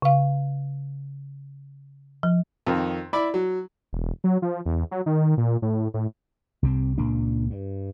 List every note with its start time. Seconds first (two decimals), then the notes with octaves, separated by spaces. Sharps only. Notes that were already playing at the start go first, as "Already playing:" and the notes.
0.02 C#3 F5
2.23 F3
2.67 F2 D#3
3.13 E4 D5 B5 D6
3.34 F#3
3.93 E1
4.24 F#3
4.42 F3
4.65 E2
4.91 F#3
5.06 D#3
5.37 A#2
5.62 A2
5.94 A2
6.63 C2 C3 C4
6.98 C#2 A#2 A#3 D4
7.50 G2